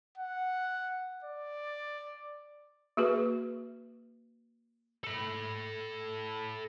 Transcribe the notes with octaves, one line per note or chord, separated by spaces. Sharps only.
F#5
D5
A#3 F#4 G#4 B4
A4 B5